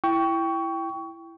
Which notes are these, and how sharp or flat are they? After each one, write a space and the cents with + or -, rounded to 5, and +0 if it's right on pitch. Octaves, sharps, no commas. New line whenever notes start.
E4 +15 G5 +0 C#6 +20